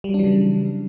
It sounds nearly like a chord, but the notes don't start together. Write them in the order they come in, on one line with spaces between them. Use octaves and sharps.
G3 F#3 D4 E3 C#3